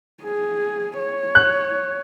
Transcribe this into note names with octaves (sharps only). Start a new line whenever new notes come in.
G#4
C#5
F#6